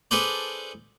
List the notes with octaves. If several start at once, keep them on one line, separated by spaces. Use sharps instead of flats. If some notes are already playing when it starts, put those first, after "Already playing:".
D4 G#4 A4 B4 C5 D5